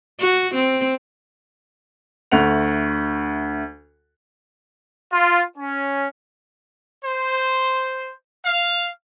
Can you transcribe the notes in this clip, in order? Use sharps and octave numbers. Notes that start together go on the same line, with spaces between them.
F#4
C4
D2 A3 F#5 F7
F4
C#4
C5
F5